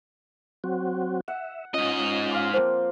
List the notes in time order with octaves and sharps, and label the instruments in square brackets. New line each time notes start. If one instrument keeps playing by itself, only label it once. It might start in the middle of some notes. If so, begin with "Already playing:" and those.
[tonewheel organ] F#3 C4 F#4
[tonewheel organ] E5 [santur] F#5
[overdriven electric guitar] G#2 D#5 [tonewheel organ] C#4 F4
[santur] F5 C6 D6
[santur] F3 A#3 C4 [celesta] C5